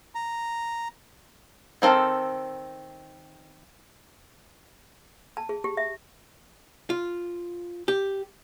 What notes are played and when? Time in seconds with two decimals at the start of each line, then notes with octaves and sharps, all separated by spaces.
0.15 A#5
1.82 D#3 C4 A4 F5
5.37 A5
5.49 G#4
5.64 G4
5.77 E5
6.90 F4
7.88 G4